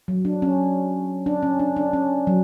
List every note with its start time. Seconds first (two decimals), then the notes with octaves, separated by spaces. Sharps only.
0.08 F#3
0.25 D4
0.42 C#4
1.26 D4
1.43 C#4
1.59 D4
1.76 D4
1.93 C#4
2.27 F#3